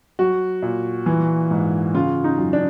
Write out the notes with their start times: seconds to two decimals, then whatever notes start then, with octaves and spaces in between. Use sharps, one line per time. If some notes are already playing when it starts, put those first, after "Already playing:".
0.19 F#3 F#4
0.62 A#2
1.06 E3
1.51 G#2
1.94 C#3 F4
2.24 D#4
2.38 F#2
2.53 D4